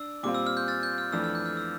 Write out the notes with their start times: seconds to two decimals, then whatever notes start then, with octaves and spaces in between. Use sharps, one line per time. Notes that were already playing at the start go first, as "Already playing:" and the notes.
Already playing: D4 E6
0.23 A#2 G3 C4 F4 D6
0.35 E6
0.47 F6
0.57 G6
0.68 F6 A6
0.83 G6
0.98 F6
1.12 F2 E3 A3 D4 E6
1.24 F6
1.35 G6
1.46 F6
1.57 E6